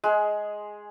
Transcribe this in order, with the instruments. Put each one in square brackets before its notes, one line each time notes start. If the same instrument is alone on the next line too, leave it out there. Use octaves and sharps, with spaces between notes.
[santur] G#3 G#4